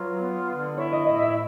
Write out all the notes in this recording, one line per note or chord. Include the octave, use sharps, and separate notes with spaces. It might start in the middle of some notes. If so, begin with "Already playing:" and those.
Already playing: F#3 F4 B4
B3
D3
E4 C#5
D#5
A2 D#5
E5